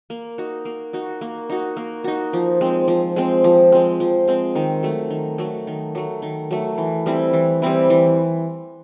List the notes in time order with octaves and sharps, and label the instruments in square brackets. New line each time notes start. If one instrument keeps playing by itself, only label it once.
[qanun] A#3
D#4 F#4
A#3
D#4 F#4
A#3
D#4 F#4
A#3
D#4 F#4
F3
G#3 C4
F3
G#3 C4
F3
G#3 C4
F3
G#3 C4
D#3
F#3 A3
D#3
F#3 A3
D#3
F#3 A3
D#3
F#3 A3
E3
G3 C4 E4
E3
G3 C4 E4
E3